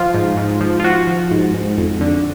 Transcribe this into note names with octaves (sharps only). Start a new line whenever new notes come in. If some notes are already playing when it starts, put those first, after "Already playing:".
Already playing: F3 F4
G#2
G#2
F3
F4
F3 F#4
F3
G#2
G#2
F2
D3